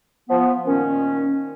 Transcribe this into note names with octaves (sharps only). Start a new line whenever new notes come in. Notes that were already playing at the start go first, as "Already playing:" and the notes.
F3 B3
A#2 D#3 C#4